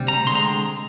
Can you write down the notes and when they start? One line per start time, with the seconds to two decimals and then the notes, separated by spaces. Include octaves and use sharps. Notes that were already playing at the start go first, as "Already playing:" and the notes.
Already playing: D2 C3 G3
0.08 A#5
0.26 D3 G#3 C4 C6
0.35 A#5